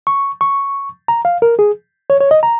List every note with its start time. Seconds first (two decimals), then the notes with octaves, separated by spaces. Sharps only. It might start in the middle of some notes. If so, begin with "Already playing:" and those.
0.07 C#6
0.41 C#6
1.08 A#5
1.25 F5
1.42 A#4
1.59 G#4
2.10 C#5
2.20 C#5
2.31 D#5
2.43 A#5